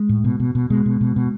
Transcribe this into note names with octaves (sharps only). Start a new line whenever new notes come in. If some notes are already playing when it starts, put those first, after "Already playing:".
Already playing: G#3
A2
B2
B2
B2
B2 G#3
B2
B2
B2